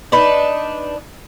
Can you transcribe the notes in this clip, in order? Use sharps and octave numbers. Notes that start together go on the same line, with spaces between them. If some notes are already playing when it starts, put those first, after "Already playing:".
D4 D#4 B4